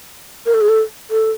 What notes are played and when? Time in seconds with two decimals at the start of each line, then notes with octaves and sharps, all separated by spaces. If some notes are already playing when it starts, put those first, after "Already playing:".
0.46 A#4
0.54 A4
0.61 G#4
0.69 A4
1.11 A4